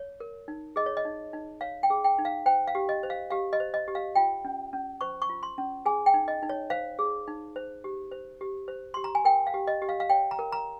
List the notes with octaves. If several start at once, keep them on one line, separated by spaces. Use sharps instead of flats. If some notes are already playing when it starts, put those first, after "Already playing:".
Already playing: C#5
A#4
D#4
G#4 D#5
C#5
D#5
D#4
D#4
C#5 F5
G5
G#4
G5
D#4
F5
C5 G5
F5
G4
D#5
C5
F5
G4 F5
D#5
C5
D#5
G4
F5
F4 G5
C#4
C#4
C5 C#6
C#6
F4
C6
C#4
G#4 G#5
G5
D#4
D#5
D#4
C#5
C5 F5
G#4
D#4
C5
G4
C5
G4
C5
G4 C6
A#5
G#5
A#4 G5
F5
G4
D#5
G4
F5
F5
C#5 G5
A#5
A#4
A#5